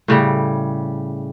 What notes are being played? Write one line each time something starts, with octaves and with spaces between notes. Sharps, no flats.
A2 C#3 G3